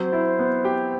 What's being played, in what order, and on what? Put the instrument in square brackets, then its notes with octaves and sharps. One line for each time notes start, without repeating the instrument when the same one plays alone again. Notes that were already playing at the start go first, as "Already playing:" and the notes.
Already playing: [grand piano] F#3 C4 [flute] C5
[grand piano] E4
B3
G4